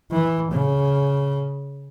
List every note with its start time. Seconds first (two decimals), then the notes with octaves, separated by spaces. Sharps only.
0.12 E3
0.52 C#3